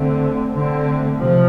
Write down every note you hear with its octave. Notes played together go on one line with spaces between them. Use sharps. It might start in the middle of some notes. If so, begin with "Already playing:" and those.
Already playing: D3 A3 C4
D3 A3 C4
C3 F3